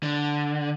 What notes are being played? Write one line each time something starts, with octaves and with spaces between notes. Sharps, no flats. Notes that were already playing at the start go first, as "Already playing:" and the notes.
D3